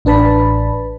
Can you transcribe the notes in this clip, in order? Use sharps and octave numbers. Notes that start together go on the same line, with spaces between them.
A1 D4 B4 A5 B5